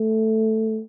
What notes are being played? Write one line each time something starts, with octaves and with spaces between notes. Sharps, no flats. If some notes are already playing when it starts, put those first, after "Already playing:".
Already playing: A3